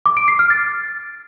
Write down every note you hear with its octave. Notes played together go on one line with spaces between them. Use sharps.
D6
D7
C7
F6
A6